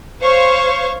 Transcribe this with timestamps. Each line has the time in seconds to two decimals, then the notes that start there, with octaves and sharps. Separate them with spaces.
0.23 C5 C#5 F5 C#6